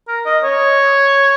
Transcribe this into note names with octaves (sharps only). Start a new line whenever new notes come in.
A#4
D#5
C#5